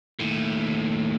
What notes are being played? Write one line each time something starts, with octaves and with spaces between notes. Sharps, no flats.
D#2 A2